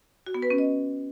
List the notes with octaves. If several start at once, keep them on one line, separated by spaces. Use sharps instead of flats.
F#4
B3
B4
C#4
D#5